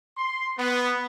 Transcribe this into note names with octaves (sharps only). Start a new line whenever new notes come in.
C6
B3